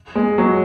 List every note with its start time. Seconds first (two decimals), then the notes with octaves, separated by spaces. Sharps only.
0.15 G#3
0.38 F#3